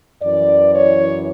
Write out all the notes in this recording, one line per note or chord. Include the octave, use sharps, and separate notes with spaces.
F#2 E3 D5
C#5